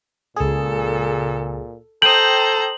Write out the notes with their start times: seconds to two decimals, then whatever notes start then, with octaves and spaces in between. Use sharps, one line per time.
0.36 C#2 A#2 G#4 A4
2.02 A4 C5 G5 A#5 D#6 F#7